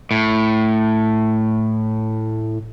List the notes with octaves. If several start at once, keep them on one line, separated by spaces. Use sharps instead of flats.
A2